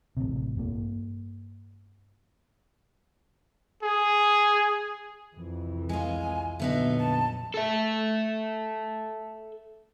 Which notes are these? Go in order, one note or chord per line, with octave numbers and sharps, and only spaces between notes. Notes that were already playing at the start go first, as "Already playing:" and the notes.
A1 C3
G2 A#3
G#4
C2 F2 E3
G#3 F4 G#5
A#1 F2 D3 F#3 B3 D#4 E5
A5
A4 E5